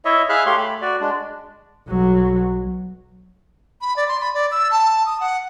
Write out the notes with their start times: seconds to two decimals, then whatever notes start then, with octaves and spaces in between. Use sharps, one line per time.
0.05 E4 C#5 D#5 E5
0.29 G#4 E5 F5 B5 F6 F#6
0.46 A3 G4 C#5 F5 C6
0.58 A3 B5
0.82 F#4 D5
1.01 G#3 D4
1.87 B1 F#3
3.81 B5
3.96 D5
4.08 C6
4.20 B5
4.34 D5
4.52 E6
4.71 A5
5.06 D#6
5.20 F#5